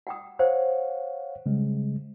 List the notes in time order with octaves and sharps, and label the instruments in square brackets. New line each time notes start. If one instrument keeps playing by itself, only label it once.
[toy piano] F#5 G5 D#6
[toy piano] C5 [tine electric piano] C#5 F5 F#5
[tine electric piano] C#3 G3 G#3